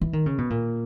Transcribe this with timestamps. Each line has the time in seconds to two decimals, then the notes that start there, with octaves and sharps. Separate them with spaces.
0.01 E3
0.13 D#3
0.26 C#3
0.38 B2
0.50 A#2